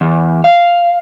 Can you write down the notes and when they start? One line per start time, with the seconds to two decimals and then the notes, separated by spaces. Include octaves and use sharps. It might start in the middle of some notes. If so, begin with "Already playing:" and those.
0.01 E2
0.44 F5